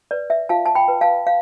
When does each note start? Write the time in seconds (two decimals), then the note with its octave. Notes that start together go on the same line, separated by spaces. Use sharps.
0.11 B4 D5
0.30 E5
0.49 F4 F5 A5
0.66 A5
0.75 G5 B5
0.88 B4
1.01 F5 A5
1.27 F5